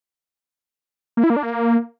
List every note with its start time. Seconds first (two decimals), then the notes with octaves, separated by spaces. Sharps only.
1.17 A#3
1.24 E4
1.30 A#3
1.36 D4
1.43 A#3